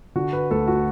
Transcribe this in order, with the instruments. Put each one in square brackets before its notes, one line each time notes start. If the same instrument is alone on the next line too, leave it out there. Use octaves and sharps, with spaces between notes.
[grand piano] D3 F#4
B4
D2 A4
F#4